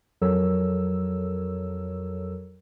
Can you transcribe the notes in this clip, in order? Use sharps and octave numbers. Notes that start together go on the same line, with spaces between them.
F2 F#3 A4 A#4 C#5 E6